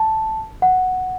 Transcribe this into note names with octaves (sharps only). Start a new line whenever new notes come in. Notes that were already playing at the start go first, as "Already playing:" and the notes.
Already playing: A5
F#5